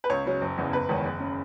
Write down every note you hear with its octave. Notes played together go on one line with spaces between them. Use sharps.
B4
C#2 C#5
C#3 F#3 C#4
F#1
E2 C#3 E3
F#1 B4
E2 D#3 G#3 C#4
F#1
C#3